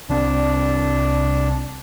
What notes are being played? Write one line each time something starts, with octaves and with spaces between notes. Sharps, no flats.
C2 C4 D4